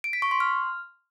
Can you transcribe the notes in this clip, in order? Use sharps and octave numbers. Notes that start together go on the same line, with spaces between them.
D7
B6
C#6
C6
F6